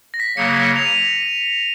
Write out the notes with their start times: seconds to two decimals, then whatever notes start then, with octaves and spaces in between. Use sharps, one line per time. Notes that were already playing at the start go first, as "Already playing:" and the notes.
0.14 A#6
0.20 B6
0.36 C#3 F#3 A#3 C#7
0.76 F7
0.86 D#7